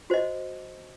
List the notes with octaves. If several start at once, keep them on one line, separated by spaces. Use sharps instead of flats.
F#4 C5 D#5